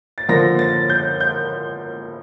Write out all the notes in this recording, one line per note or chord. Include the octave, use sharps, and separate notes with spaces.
A6
D3 F3 A#3 A#6
A6
G6
G6